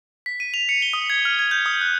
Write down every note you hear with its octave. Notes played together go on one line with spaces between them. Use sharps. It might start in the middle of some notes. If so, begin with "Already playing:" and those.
B6
D#7
F7
C#7
G7
D#6
G#6
F6
G#6
G6
D#6
F#6